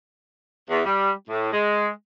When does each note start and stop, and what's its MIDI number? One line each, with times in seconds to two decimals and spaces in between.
0.70 0.81 40
0.85 1.11 55
1.29 1.49 45
1.53 1.88 56